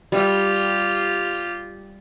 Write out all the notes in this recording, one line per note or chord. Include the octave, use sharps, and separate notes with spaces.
G3 F4 G4